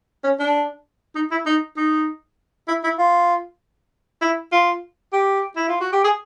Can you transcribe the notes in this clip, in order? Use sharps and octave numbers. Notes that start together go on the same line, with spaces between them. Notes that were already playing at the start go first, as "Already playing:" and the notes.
C#4
D4
D#4
E4
D#4
D#4
E4
E4
F4
E4
F4
G4
E4
F4
F#4
G4
G#4